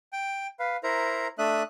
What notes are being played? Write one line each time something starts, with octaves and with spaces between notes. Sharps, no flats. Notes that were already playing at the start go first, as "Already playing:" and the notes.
G5
B4 F5
E4 A#4 C5 A#5
A3 D4 E5 D#6 F#6